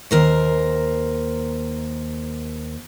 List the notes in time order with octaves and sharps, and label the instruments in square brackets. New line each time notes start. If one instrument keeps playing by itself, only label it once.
[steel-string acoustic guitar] D#2 A#4 C5